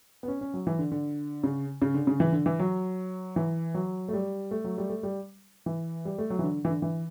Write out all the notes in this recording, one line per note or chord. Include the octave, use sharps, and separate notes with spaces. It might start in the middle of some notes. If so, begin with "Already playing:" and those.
B3
C#4
C#4
F#3
E3
D3
D3
C#3
C#3
D3
C#3
E3
D3
E3
F#3
E3
F#3
A3
G3
A3
F#3
G3
A3
G3
E3
G3
A3
F#3
E3
D3
E3
D3
E3